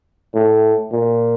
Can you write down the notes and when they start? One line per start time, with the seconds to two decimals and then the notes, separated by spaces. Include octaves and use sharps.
0.34 A2
0.92 A#2